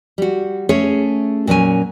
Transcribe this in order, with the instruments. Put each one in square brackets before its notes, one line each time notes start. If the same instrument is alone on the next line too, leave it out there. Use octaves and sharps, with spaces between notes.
[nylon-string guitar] G3 F#4
A3 C#4 G#4 C#5
A#2 F#3 C#4 G#5